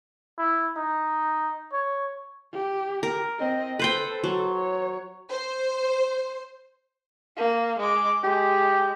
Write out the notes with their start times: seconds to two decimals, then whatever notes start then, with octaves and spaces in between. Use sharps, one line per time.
0.38 E4
0.76 D#4
1.73 C#5
2.53 G4
3.03 A#4
3.39 C4 D#5
3.79 A4 B4 C5 G5
4.24 F#3
4.54 C#5
5.30 C5
7.36 A#3
7.79 G#3 D6
8.24 G#3 G4